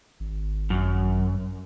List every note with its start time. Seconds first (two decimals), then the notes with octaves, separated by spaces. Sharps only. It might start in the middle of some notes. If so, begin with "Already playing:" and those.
0.20 G#1
0.70 F#2